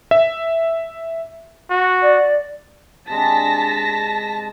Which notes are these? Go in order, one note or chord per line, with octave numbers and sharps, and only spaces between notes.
E5
F#4
D5
C3 G#3 D4 A5 A#6 B6